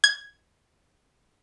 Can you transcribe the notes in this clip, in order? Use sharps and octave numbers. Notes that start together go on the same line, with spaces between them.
G#6